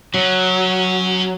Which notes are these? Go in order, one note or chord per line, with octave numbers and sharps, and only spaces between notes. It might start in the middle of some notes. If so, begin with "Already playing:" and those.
F#3 C#4 G#4